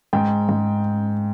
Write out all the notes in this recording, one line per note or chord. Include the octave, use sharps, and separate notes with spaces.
G#2 G5
G#2